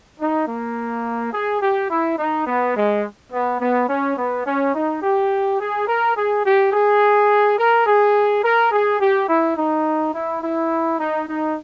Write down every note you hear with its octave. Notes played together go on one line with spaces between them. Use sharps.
D#4
A#3
G#4
G4
E4
D#4
B3
G#3
B3
B3
C#4
B3
C#4
D#4
G4
G#4
A#4
G#4
G4
G#4
A#4
G#4
A#4
G#4
G4
E4
D#4
E4
E4
D#4
D#4